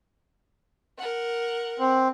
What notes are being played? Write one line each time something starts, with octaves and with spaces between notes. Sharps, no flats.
A#4 F#5
C4